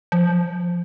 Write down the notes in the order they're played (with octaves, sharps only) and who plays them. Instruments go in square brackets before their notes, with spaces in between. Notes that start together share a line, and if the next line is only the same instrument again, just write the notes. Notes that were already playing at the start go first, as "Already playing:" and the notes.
[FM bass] F3